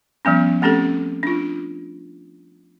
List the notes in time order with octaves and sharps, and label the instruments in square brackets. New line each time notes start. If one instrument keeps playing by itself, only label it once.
[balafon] F3 G3 B3 C#4
A3 C4 C#4 G4 A4
D4 F4